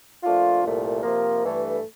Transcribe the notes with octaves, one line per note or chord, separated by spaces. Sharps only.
A#2 F3 A3 D4 F4
C2 A#2 A3
C3 F3 A#3
G2 E3 A3